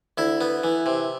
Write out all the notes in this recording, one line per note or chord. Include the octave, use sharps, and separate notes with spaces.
D2 E4
B3
E3
C3